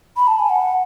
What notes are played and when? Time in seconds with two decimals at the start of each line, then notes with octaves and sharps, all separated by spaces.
0.17 B5
0.27 A5
0.39 G#5
0.50 F#5